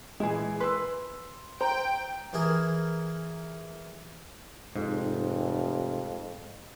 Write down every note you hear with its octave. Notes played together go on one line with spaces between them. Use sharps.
A#2 E3 G#3 E4 G#4
B4 C6 E6
C5 G5 A#5
E3 E4 G#4 A#4
F1 F2 G#2